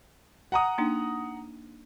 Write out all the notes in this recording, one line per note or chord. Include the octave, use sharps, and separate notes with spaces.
F#5 A#5 D#6
A#3 D4 D#4